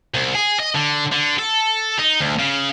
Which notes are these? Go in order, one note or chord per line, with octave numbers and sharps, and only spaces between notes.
C2
G#4
D#5
D3
D3
A4
D#4
D2
C#3